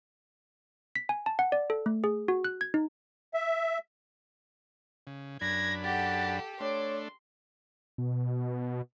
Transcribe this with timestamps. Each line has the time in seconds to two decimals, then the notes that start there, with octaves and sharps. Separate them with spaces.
0.96 B6
1.09 G#5
1.26 A5
1.39 F#5
1.52 D5
1.70 A4
1.86 A3
2.04 G#4
2.28 F#4
2.44 F#6
2.61 G#6
2.74 D#4
3.34 E5
5.07 C#3
5.41 F#2 D4 B5 G#6 A#6
5.84 G4 A4 F#5 A6
6.61 A3 D4 C#5 C6 D6
7.98 B2